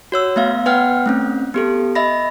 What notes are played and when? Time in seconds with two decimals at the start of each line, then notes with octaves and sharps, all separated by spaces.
0.12 F#4 C#5 E6
0.36 A3 B3 E5 F5
0.66 B3 B4 F#5 G5 F6
1.06 A3 C4 C#4
1.54 B3 G4 A4
1.95 D#5 E5 B5 A#6